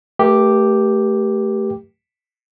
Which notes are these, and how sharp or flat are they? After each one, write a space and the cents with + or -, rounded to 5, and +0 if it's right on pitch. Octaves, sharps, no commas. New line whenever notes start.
A3 +0 G4 +0 A#4 +45